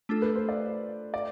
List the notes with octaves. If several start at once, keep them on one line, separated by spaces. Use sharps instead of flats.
A3 D4 F4 A4
B4
C5
D5
D5